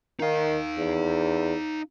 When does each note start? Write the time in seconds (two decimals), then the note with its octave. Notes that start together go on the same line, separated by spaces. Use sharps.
0.20 D#3 D#4 F5
0.78 E2